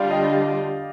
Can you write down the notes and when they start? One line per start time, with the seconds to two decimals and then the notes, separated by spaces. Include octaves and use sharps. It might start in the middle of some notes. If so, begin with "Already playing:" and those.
Already playing: D3 G3 D4 F4 D5 F5
0.11 D#5 G5